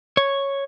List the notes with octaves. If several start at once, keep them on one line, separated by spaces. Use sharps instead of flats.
C#5